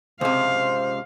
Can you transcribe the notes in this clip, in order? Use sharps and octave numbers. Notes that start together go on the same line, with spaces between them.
C#2 C3 C5 F5